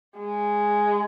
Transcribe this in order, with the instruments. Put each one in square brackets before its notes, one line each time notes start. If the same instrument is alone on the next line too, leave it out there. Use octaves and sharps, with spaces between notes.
[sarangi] G#3